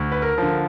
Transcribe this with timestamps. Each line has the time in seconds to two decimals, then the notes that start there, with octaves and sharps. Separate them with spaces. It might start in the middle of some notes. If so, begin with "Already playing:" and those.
Already playing: D2
0.12 B4
0.22 A#4
0.38 D3 F3